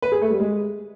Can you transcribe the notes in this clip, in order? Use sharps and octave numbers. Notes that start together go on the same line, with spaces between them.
B4
G#4
A3
G3
G#3